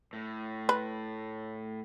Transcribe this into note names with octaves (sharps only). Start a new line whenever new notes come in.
A2
B4